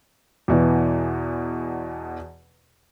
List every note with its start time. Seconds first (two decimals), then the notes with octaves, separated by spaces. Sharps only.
0.48 E2 B2 E3